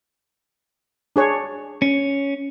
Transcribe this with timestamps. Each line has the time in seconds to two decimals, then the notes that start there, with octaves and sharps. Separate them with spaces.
1.16 D4 G#4 C#5
1.82 C#4